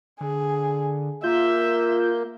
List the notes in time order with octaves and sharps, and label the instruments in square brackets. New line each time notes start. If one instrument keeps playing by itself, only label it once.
[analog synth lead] D3 [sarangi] G#4
[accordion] A#3 [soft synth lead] F4 [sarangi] E5 [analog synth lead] G6